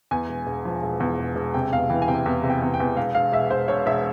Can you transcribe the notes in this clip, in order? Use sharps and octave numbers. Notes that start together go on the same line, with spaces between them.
E2 G#5
E1
E1
F3
E1
E2
E1
E1
C3 G5
E2 F5
E3 G5
G#5
C3 G5
E2
C3
G5
E2
G5
E2
E1 F5
E1 F5
E1 E5
E1 C5
E1 C#5
E1 E5